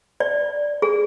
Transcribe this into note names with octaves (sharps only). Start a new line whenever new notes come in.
D5
G#4